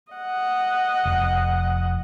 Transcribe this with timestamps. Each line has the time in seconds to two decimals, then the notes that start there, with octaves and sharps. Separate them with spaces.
0.12 D#5 F#5
1.05 F1